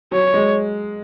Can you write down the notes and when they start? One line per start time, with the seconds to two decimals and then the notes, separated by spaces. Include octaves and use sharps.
0.12 F#3 C#5
0.34 G#3